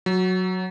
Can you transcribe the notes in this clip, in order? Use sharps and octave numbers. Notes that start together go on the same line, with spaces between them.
F#3